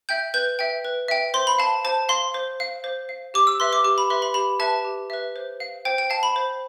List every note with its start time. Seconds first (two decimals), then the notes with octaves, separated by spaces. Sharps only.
0.09 E5 G5 G6
0.34 B4 G6
0.59 E5 G5
0.85 B4
1.08 E5 G5
1.34 C5 C6
1.47 B5
1.59 F5 A5
1.85 C5 A5
2.09 F5 C6
2.34 C5
2.60 F5
2.84 C5
3.09 F5
3.34 G4 D6
3.47 E6
3.60 B4 E5 C6
3.73 D6
3.84 G4 D6
3.98 B5
4.10 B4 E5 C6
4.22 B5
4.34 G4 B5
4.59 B4 E5 A5
4.85 G4
5.10 B4 E5
5.36 C5
5.60 F5
5.85 C5 G5
5.98 G5
6.10 F5 A5
6.23 B5
6.36 C5